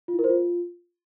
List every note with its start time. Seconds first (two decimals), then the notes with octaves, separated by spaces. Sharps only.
0.08 F4
0.13 E4
0.19 A#4
0.24 C5
0.29 F4